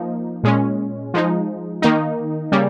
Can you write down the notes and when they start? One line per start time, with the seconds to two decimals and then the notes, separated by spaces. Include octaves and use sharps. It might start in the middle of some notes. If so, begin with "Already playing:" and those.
Already playing: F3 A#3 D#4
0.43 A#2 G#3 C#4
1.14 F3 G#3 D#4
1.82 D#3 A#3 D#4
2.52 C#3 G3 A#3